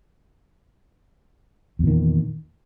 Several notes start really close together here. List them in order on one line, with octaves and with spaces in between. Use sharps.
E2 A#2 D#3